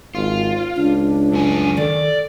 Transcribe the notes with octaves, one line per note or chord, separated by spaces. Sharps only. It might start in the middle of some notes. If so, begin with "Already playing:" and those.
G#1 F4
C#2 D4
F#2 A3 G#5
D#3 A4 D5